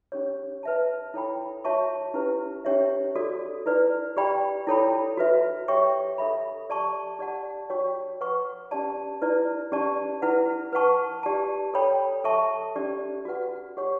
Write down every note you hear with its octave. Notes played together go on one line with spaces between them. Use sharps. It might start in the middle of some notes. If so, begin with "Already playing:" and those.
C#4 G4 C#5
B4 E5 A5
E4 A4 C#5 G5 B5
F#4 C#5 E5 A5 C#6
C#4 E4 G4 B4
C#4 G4 C#5 E5
F#4 A4 D5
E4 B4 D5
G4 D5 G5 B5
E4 A4 C#5 G5 B5
F#4 B4 E5
G4 C#5 E5 G5 C#6
A4 E5 B5
G4 D5 A5 C#6
G4 D5 F#5 A5
F#4 C#5 G5 C#6
B4 F#5 C#6
C#4 G4 D5 A5
E4 B4 D5
C#4 G4 D5 A5 C#6
E4 B4 F#5
B4 F#5 A5 C#6
G4 D5 A5
A4 C#5 G5 B5
A4 E5 A5 C#6
C#4 G4 D5
F#4 B4 F#5
G4 C#5 F#5 C#6